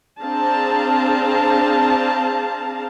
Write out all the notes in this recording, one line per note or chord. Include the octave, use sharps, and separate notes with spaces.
C4 D4 G#4 F5 A5 A#5